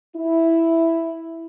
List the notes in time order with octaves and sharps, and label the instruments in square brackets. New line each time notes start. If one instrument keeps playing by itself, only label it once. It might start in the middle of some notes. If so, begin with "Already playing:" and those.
[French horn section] E4